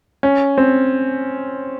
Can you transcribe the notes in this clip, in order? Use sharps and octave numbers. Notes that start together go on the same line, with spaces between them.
C#4
C4